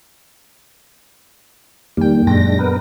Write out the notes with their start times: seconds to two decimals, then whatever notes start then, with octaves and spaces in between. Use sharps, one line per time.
1.97 F2 D#3 G3 A#3 G5
2.27 F#2 A#2 G#3 D4 G5 A#6
2.59 B3 A#4 B4